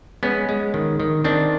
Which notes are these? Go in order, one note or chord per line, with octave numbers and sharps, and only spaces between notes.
G#3 B3 C#4
G#3
D#3
D#3
D#3 C4 D4